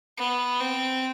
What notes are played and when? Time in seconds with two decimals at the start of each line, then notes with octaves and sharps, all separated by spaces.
0.18 B3
0.60 C4